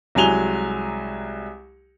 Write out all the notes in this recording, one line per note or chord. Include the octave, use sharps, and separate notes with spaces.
C2 F#3 G#3 G#5 F7 G7